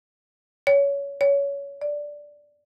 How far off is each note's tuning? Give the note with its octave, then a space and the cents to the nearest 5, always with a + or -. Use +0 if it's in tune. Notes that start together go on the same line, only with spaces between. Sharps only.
C#5 +20
C#5 +20
D5 +0